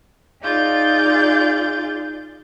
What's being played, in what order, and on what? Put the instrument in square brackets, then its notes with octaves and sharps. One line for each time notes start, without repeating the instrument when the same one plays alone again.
[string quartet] D#4 F4 G#4 D5 G6 A6